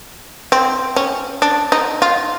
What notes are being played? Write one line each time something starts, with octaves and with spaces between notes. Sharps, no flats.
C4
C#4
D4
D#4
F4